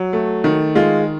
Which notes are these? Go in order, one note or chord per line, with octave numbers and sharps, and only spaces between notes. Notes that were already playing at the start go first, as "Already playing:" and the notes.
Already playing: F#3
A3
D#3
G#3 F4